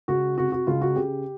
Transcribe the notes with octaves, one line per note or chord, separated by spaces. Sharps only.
C#2 F#4
C3 F#4
F#4
C#2 F4
F#4
C#3 G4